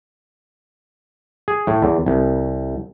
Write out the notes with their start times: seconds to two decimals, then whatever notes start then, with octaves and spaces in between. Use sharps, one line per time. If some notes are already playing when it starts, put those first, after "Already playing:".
1.48 G#4
1.67 A2
1.82 E2
2.06 C2